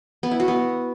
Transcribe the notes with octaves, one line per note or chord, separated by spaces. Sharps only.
B3
E4
F#4
B3